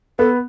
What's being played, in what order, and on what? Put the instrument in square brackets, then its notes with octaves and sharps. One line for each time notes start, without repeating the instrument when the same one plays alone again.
[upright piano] B3 [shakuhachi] A4